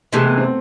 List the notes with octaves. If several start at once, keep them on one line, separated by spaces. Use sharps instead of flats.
C3 E3 G#3 A3
B3
C4